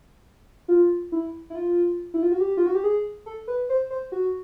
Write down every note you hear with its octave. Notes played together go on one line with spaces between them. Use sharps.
F4
E4
E4
F4
E4
F4
F#4
G4
F4
F#4
G4
G#4
A4
B4
C5
C5
F#4